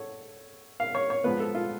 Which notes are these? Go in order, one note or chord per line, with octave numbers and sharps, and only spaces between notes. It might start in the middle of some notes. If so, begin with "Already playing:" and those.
Already playing: A4 C#5
F5
C#5
C#5
G#2 F3 B3 B4
A4
F4